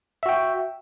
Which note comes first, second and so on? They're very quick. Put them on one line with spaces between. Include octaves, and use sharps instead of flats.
E5 F#4 G5